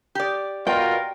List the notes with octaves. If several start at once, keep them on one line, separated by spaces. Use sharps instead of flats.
G4 D5
B2 F4 A#4 G5